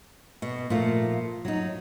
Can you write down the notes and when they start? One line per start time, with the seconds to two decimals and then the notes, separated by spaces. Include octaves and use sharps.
0.42 B2
0.70 A#2 F3 A3 F4
1.45 F#3 D#4